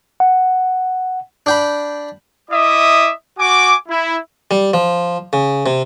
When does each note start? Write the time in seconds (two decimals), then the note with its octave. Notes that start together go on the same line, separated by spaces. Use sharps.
0.20 F#5
1.46 D4 G5 B5
2.50 E4 D#5 E5 D6 D#6
3.39 F#4 G#5 D6
3.88 E4
4.51 G3
4.74 F3
5.33 C#3
5.66 C3